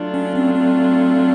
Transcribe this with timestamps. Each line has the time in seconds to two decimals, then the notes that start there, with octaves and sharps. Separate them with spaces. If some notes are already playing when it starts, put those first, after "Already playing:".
Already playing: F#3 A3 D4 F4
0.14 C#4
0.35 C4
0.55 C4